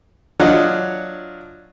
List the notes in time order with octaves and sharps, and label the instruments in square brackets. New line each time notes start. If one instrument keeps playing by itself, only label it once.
[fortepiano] F#3 D4 F4 C#5 D#5 F#5